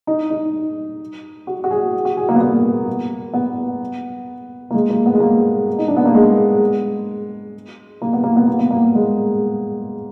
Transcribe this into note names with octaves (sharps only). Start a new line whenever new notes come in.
D#4
D#4
F#4
F#4
G#4
F#4
G#4
A#3
B3
A#3
B3
A#3
G#3
A#3
B3
G#3
A#3
D#4
D4
B3
A#3
G#3
A#3
B3
A#3
B3
A#3
B3
A#3
G#3